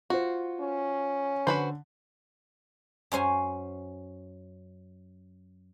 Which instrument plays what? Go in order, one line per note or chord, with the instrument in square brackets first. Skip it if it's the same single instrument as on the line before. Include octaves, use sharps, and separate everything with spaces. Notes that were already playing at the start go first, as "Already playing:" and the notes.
[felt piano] F4 C5 [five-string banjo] F#4
[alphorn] C#4
[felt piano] D3 [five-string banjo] F#4 B4 C5
[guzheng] F#2 C#4 C5 G#5